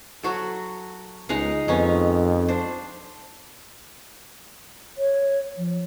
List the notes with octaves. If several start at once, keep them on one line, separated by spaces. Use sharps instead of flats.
F#3 F#4 A4
C#2 G#3 D#4 F5
F2 B3 C#4 D#4
D4 C5
C#5
F3